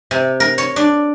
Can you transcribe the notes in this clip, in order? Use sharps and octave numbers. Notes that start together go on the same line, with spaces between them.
C3
A#4
C#5
D4